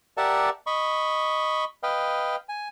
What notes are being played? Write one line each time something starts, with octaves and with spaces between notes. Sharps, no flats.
G4 A#4 D5 E5 F#5 A5
D#5 B5 C#6
B4 D#5 F5 G5
G#5